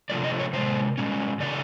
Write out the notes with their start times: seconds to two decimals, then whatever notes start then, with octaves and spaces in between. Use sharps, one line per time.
0.10 C3 F3 A3 D4 D5
0.24 D#5
0.39 C#5
0.53 C3 F3 G#3 C5
0.98 B2 G#3 C#4
1.40 C#3 E3 A3 D4 D5